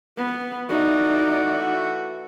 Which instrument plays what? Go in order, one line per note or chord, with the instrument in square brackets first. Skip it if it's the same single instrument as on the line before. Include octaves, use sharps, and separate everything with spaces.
[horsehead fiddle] B3
[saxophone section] E3 A3 F#4 [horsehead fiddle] D#4 D5